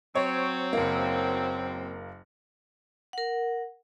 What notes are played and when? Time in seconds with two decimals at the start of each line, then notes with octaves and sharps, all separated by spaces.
0.15 F#3 C4 C5 C#5
0.73 F#1 A#3
3.13 A#4 F#5